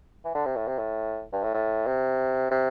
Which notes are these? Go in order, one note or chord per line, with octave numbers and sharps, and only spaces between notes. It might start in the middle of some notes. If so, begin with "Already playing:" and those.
E3
D3
C3
A2
C3
A2
G2
A2
A2
C3
C3